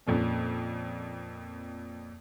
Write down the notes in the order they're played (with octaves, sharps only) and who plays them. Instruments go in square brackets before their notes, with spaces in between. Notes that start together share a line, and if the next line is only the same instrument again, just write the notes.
[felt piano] F2 A#2 C#4